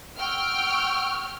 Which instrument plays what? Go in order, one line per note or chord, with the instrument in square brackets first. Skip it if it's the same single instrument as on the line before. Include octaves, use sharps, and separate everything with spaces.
[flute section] F#5 C#6 E6 [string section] G5 F6